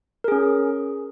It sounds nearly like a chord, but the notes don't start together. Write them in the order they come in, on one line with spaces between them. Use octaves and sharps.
A#4 G#4 C#4